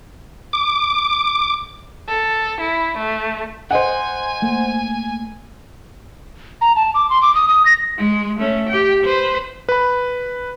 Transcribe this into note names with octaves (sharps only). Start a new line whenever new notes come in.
D6
A4
E4
A3
C5 D#5 F#5 G#5
A3 A#3
A#5
A5
D6
C6
D6
D#6
D#6
A#6
G#3
A3 C#4
G4 G5
B4 C5
B4 B5